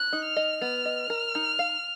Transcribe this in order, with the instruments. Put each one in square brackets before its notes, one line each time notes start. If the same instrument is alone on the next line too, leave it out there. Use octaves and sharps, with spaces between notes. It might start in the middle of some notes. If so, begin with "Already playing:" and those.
Already playing: [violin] F#6
[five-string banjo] D#4
[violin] F6
[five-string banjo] D#5
[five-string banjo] B3 [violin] F6
[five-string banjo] D#5
A#4
D#4
F5